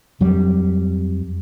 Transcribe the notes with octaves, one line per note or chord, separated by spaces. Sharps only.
F2 F#3 G3